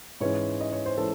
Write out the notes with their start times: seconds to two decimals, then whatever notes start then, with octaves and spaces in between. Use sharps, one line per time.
0.20 G#2 E3 G#3 C#4 C#5
0.61 D#5
0.72 C#5
0.86 C5
0.97 E3 G#3 C#4 A4